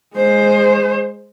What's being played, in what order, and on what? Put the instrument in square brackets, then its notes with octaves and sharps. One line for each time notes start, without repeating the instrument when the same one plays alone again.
[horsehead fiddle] G#3 C5